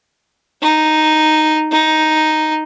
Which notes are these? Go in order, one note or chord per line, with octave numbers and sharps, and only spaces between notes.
D#4
D#4